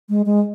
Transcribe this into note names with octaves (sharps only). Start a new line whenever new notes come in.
G#3
G#3